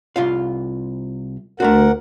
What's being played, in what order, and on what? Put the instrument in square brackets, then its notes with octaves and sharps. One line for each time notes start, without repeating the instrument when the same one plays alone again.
[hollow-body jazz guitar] C2 F4 F5
[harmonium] D2 A#4 F#5 [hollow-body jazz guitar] A3 D4 F#4